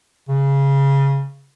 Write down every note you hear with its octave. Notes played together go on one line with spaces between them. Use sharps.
C#3